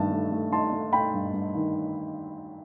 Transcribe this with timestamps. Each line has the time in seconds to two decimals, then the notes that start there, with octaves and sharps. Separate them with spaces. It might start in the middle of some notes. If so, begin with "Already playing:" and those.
Already playing: G2 D#3 A3 A5
0.11 A3
0.32 A3
0.52 A3 A5 C6
0.72 A3
0.93 A3 G5 B5
1.14 G2
1.34 G2
1.55 D#3